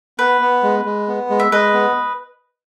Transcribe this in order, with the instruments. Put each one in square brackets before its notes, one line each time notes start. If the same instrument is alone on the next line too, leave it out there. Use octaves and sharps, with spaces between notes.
[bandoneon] B3 [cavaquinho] B4
[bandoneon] B3
G#3
G#3
B3
G#3
[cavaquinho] E5
[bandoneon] G#3 [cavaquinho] B4 D#5
[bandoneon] B3